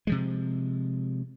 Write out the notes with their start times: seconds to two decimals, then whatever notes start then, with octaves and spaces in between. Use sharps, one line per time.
0.07 C3 F3 G#3